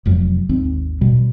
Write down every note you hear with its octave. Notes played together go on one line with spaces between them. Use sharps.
F1 F2 F#3
G#1 D#2 C4
B2 G3